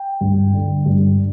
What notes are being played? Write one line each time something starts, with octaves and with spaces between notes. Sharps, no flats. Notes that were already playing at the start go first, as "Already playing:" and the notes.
Already playing: G5
G2
D3
G2